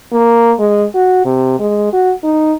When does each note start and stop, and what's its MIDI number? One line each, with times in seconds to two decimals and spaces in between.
0.12 0.52 58
0.59 0.86 56
0.94 1.22 66
1.25 1.58 48
1.59 1.88 56
1.93 2.12 66
2.23 2.53 63